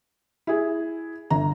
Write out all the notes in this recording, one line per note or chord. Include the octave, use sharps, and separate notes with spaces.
E4 G#4
G1 A#5